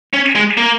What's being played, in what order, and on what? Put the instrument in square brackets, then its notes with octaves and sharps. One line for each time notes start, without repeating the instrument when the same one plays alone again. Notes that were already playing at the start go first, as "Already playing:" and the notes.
[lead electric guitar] C#4
G#3
A#3